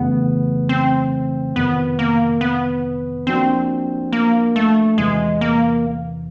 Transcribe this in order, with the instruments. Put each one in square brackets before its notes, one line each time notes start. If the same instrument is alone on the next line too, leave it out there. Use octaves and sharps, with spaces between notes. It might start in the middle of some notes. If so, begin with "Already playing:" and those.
Already playing: [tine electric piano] F2 C#3 E3 A3 [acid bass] B3
[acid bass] C4
[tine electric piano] F2 C3 D#3 [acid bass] B3
[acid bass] A#3
B3
[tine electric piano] F3 A#3 D4 F#4 [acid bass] C4
[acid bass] A#3
A3
[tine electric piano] E2 C3 E3 [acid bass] G#3
[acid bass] A#3